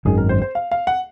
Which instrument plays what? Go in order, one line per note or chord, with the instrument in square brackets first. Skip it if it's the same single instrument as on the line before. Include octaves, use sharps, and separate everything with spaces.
[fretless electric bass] G#1 F#2 D#3 [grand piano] G#4
[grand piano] A#4
C5
C5
F5
F5
F#5